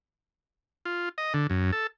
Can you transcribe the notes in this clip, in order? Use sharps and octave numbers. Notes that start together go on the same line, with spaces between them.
F4
D#5
D3
F#2
A4